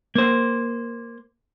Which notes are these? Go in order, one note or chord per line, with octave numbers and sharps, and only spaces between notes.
A#3 C5